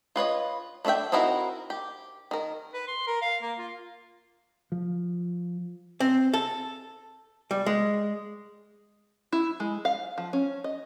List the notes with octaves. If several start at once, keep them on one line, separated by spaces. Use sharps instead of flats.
F4 B4 C#5 D#5
A3 D4 C#5 E5 G5
C4 D#4 E4 F#4 A#4
G4
D#3 A#4
B4
C6
A#4
F5
A#3
F4
F3
C4
A4
G3
G#3
E4
G#3
F5
F3
C#4
D#5